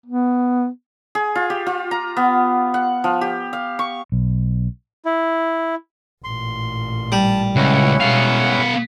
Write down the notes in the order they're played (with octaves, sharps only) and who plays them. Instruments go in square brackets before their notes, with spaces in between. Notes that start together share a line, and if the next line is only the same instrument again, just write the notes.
[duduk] B3
[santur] G#4
F4
G4
F4
A#5
B3
F#5
F3
G4
F5
C#6
[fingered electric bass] B1
[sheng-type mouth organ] E4
[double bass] A1 A#2 [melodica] C6
[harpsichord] G3 [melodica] A5
[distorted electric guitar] C#2 [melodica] C#4 E4 F#5
[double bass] B2 G#3 [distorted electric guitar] B3 F5